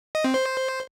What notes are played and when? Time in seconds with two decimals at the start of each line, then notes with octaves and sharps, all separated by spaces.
0.15 D#5
0.24 C4
0.34 C5